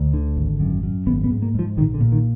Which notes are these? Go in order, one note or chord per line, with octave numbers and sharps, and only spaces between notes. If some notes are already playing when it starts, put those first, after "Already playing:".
Already playing: D2
D3
G#1
F#2
F#2
G#1 B3
B3
G#2
A#3
G#2 F3
A#1 D#3
D3
A#2
D#3